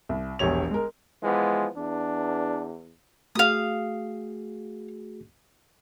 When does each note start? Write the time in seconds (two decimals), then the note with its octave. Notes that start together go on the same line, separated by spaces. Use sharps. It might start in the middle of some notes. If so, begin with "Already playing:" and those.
0.09 C2
0.39 E1 A#1 G4 C#5 F7
0.71 G#3 A#4
1.23 E3 F3 G#3 B3
1.77 E2 D4
3.35 A3 F#4 G#4 F5 D#6